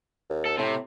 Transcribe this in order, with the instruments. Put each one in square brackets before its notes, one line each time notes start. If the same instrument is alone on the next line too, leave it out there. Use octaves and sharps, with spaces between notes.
[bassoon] D#2
[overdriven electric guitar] A4
[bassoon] A2 [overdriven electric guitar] C3